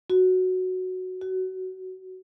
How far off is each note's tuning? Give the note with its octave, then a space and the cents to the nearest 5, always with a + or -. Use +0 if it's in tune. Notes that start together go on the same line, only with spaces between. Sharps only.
F#4 +0
F#4 +20